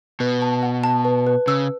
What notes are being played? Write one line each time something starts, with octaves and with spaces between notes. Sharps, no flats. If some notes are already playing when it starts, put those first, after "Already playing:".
B2 B4
A5
F#5
A5
B4
B4
C#3 E6